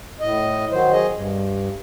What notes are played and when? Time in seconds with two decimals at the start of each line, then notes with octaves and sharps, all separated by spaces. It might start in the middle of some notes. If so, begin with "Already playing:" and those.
0.21 A2 D#5
0.71 D#3 F#3 C5
0.92 G#4 D#5
1.13 G2